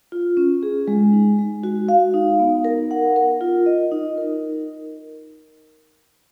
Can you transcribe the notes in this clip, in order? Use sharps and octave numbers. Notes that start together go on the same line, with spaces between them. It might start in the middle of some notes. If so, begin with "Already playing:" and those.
F4
C#4
G#4
G#3
D#4
G#3
F#4
F5
D#4
B3
A#4
F#5
A#4
F4
D#5
D#4
A#4